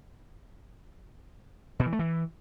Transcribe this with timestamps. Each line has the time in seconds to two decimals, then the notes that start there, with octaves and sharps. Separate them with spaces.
1.79 B2
1.86 E3
1.93 A3
1.99 E3